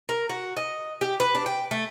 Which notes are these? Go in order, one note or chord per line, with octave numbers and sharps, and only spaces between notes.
A#4
F#4
D#5
G4
B4
D4
G5
A3